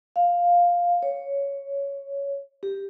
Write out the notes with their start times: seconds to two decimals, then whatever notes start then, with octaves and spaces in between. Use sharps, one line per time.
0.16 F5
1.03 C#5
2.63 G4